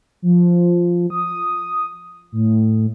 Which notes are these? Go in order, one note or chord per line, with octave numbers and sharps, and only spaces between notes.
F3
D#6
A2